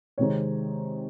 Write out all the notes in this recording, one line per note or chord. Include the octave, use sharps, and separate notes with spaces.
C3 D#3 G#3 C4 D#4 C#5